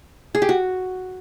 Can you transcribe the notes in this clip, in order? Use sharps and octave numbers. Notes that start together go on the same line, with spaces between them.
G#4
G4
F#4